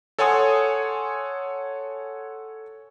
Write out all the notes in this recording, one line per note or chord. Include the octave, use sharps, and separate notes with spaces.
A4 C#5 F#5 G#5 C6 D#6